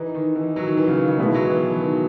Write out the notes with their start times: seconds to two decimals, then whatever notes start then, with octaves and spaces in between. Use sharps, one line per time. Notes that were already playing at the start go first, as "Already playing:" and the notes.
Already playing: E3 D#4
0.14 D#3
0.36 E3
0.56 F#3
0.67 D#3
0.77 E3
0.88 C#3
0.98 D#3
1.08 C#3
1.18 B2 D#3 G#3 B3 E4
1.34 F#3
1.50 E3
1.65 E3
1.81 D#3